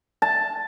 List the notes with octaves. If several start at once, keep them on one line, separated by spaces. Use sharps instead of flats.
A5